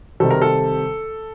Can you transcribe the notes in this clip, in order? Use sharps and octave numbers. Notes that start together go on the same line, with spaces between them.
C3 D#3 G3 C4 A4
A#4
A4